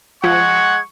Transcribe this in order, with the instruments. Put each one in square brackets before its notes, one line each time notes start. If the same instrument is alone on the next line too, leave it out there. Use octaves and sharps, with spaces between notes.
[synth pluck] F3 [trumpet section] G#3 F#5 [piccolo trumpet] C#6 [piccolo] G#6